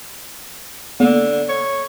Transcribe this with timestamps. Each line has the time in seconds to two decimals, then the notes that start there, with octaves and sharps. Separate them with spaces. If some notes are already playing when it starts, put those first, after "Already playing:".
1.00 D3 A#3 B3
1.49 C#5